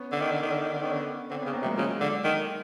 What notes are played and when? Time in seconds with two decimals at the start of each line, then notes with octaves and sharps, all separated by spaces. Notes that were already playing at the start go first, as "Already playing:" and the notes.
Already playing: B3 C#4
0.12 D3
0.22 D#3
0.32 D3
0.43 D#3
0.52 D3
0.62 D#3
0.73 D3 D4
0.82 D#3 B3 C#4
0.93 D3
1.30 D3 C4 D4
1.42 C#3 B3 C#4
1.53 A#3 C4
1.62 C3
1.65 F#3 G#3
1.77 C#3 F#3 G#3
2.01 D3
2.24 D#3